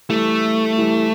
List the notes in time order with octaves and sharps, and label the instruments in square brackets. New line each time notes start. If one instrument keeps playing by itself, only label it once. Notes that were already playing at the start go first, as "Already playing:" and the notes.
[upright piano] E3 G3 [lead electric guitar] A3
[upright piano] E3 G3